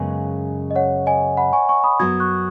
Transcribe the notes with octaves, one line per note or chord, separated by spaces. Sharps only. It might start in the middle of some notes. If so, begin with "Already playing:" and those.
Already playing: F#2 C#3 G#3 B3 G#4 D#5 G#5
D#5
C#5 F#5
D#5 G#5
F#5 B5
G#5 C#6
G#5 C#6
B5 D#6
F#2 F#3 B3 F#4 D#6 G#6
C#6 F#6